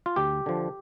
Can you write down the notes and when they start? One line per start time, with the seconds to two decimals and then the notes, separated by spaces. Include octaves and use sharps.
0.06 F4
0.16 D2 G4
0.46 D3 F3